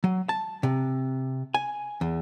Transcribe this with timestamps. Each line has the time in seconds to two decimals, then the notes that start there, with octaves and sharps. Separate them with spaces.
0.04 F#3
0.29 A5
0.63 C3
1.54 G#5
2.01 E2